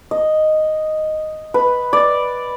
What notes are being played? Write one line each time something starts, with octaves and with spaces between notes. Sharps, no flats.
D#5
B4
D5